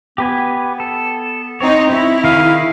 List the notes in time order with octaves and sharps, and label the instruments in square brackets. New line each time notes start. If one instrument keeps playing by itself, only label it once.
[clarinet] B3 [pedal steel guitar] G4 B4 G#5
[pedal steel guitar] A4
[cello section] C4 D#4 [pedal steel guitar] C#5
[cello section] E4
[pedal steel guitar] D#3 G#4 [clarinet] F5